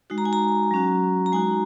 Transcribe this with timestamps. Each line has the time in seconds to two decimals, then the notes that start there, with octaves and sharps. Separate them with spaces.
0.10 G#3 D#4 F#4
0.18 A#5
0.25 G#5
0.33 A#5
0.71 F#3 C#4 F#4
1.26 A#5
1.32 G#3 D#4 F#4 G#5